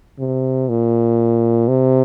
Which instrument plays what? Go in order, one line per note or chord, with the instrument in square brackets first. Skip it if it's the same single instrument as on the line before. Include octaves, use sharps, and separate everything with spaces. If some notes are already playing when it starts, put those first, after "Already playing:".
[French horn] C3
A#2
C3